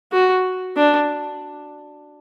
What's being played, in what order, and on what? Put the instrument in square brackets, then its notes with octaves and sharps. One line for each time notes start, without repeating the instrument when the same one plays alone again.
[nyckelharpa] F#4
D4